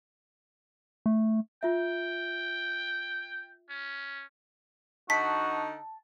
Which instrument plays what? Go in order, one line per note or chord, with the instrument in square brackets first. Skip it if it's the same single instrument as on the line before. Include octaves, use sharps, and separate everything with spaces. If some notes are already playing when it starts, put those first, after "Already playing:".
[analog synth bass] A3
[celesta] F4 E5 [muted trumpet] G5
[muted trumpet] C#4
[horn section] D3 D#4 [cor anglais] F#4 [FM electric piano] A5 [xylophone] B6